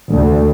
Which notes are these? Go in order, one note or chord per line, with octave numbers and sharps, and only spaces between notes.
D2